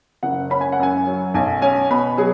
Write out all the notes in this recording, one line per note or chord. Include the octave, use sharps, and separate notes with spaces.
F#1 F#5
C#4 B5
G#5
F#5
F#2 G#5
F#3
B1 G#5
C#4 G#5
B2 B5
F#3 G#4